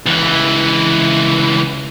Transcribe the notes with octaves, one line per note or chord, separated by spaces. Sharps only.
C#2 E3